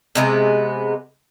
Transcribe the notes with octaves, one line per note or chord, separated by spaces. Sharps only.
C3 G#3 B3